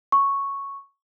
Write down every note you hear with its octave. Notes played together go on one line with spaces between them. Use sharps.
C#6